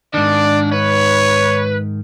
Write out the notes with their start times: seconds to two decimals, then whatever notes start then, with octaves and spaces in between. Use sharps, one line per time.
0.14 G#2 D#3 D4 D5
0.72 B4 C#5